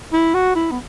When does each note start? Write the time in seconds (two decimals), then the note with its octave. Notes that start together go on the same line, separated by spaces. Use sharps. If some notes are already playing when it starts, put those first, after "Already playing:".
0.13 E4
0.35 F#4
0.55 E4
0.71 B3